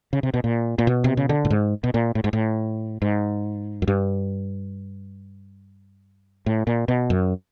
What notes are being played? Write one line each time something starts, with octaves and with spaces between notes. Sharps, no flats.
C#3
C3
B2
A#2
A#2
B2
C3
C#3
D3
A2
G#2
B2
A#2
A2
G#2
A2
G#2
F#2
G2
A2
A#2
B2
F#2